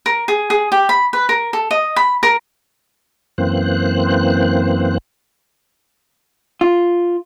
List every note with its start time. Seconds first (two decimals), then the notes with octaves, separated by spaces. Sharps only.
0.06 A#4
0.28 G#4
0.50 G#4
0.72 G4
0.89 B5
1.13 B4
1.29 A#4
1.53 A4
1.71 D#5
1.96 B5
2.23 A#4
3.38 F#2 E3 A#3 C4 C5 F#6
6.61 F4